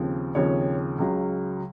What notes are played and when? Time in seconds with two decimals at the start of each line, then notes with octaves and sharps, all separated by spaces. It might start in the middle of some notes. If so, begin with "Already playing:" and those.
Already playing: D#2 C#3 F3 C4
0.35 D#2 C#3 F3 C4 C#5
0.98 C#2 C#3 F#3